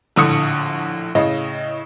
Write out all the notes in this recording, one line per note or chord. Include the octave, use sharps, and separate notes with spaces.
A#1 A2 D3 C#6 D#6 C#7
A2 C#3 D#5